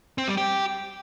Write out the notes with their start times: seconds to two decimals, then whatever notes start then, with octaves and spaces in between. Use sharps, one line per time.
0.18 C4
0.28 G3
0.37 G4